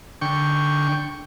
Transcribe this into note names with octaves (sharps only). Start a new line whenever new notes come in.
D3 G5 C#6